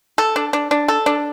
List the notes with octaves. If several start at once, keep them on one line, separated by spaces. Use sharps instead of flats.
A4
D4
D4
D4
A4
D4